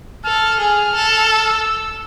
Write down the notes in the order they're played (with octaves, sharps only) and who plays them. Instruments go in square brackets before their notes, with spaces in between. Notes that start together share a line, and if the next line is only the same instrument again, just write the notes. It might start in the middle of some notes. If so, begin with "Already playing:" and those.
[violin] A4 [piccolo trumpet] F6
[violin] G#4 [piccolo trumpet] F6
[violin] A4
[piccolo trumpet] E6